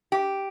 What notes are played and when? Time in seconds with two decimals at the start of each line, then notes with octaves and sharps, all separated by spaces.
0.12 G4